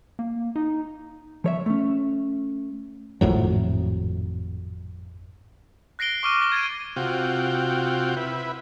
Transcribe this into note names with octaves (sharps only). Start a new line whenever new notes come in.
A#3
D#4
F3 C#5 E5
A3 C#4
G#1 F2 A2 F#3
F#6 A#6 C7 D7 G7
C#6 D6 F6 D#7
C#6 A#6 G7
G#6 A6 D7 D#7
C3 F4 F#4 G5
E4 B4